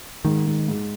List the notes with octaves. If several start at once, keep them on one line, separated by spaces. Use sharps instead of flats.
G#2 D#3
G#2
G#2